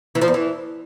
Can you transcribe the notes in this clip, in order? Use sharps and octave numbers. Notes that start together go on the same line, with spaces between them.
E3
F3
E2
E3